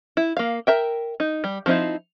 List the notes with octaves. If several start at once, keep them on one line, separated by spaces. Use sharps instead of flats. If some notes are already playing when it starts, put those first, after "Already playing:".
E4
A#3 F5
A#4 E5 G5
D#4
G3
F3 C4 D#4 E4